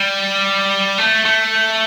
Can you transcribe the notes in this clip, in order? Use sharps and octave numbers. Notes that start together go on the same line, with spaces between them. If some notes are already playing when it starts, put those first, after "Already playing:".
Already playing: G3
A3
A3